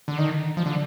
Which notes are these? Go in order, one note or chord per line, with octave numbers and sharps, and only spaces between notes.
D3
D#3
F3
D3